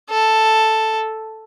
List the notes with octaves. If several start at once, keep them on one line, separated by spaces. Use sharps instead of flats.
A4